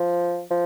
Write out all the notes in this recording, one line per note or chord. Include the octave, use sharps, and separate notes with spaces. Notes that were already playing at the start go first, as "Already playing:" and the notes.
Already playing: F3
F3